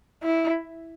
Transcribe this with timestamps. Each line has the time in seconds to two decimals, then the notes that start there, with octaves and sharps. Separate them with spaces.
0.23 E4